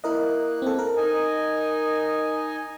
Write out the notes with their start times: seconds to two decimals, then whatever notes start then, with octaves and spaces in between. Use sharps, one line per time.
0.04 A#3 E4 A#4 D#5 F#6
0.62 C4 A4
0.79 A#4
0.97 D#4 D#5 G#5